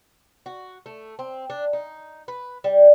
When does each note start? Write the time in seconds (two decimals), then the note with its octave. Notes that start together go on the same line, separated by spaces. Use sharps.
0.46 F#4
0.86 A3
1.19 C4
1.50 D4
1.73 D#4
2.28 B4
2.64 G3